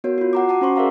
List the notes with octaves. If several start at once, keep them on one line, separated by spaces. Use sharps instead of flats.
B3 F#4 A#4 C#5
F4 F#4
F#5 A#5 D6
F#4 F#5 A5 D6
C#4 C5 C6 C#6
G#4 A#4 D5 E5 F5 A#5